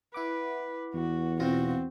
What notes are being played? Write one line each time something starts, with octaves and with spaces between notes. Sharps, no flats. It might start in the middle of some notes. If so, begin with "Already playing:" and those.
E4 B4 F#5 D6
E2 F#4
B2 C4 F4 F#4 A#6